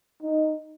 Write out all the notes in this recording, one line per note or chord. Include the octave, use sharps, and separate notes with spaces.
D#4